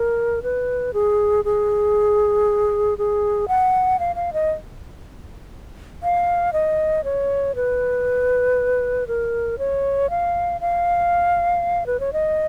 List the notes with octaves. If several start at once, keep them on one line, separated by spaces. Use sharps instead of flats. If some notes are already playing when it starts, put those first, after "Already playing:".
Already playing: A#4
B4
G#4
G#4
G#4
F#5
F5
F5
D#5
F5
D#5
C#5
B4
A#4
C#5
F5
F5
B4
C#5
D#5